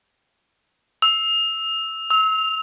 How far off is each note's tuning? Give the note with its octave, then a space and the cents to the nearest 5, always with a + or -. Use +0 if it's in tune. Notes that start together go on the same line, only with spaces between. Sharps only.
E6 -15
E6 -35